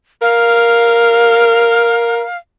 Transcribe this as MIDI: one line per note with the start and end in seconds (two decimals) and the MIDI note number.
0.22 2.22 70
0.22 2.38 77